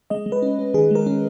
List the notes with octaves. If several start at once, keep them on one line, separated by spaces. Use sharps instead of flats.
G#3 D#5
G#3
B4
C#4
C#4
D#3 G#4
G#3 A#4
C#4